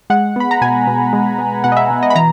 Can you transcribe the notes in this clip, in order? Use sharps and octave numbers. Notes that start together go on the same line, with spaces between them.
G#3 F#5
B3 B5
A#5
B2 G#5
B2
G#3
B3
B2 F#5
D#5
E5
B2
D#5
B5
E3 A#5